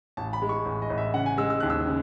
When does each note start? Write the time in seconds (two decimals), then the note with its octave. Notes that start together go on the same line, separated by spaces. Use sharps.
0.17 A1 A5
0.33 B5
0.42 G#3
0.49 C#6
0.65 A1
0.82 D#5
0.90 A1
0.98 E5
1.14 C#3 F#5
1.26 G#5
1.38 G#3 E6
1.50 E6
1.60 D#2 F#6
1.70 E6
1.87 C#3